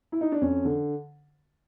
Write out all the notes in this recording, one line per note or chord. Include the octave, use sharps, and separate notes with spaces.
E4
D#4
D4
F2 C#4
D3